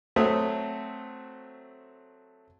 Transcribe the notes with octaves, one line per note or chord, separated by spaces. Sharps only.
F#3 A3 C4 E5 D#6